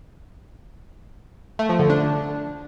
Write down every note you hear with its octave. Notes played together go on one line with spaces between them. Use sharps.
A3
F3
D3
D4